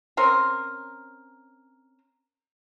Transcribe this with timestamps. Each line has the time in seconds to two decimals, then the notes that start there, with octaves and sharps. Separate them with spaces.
0.17 C4 C#4 A#4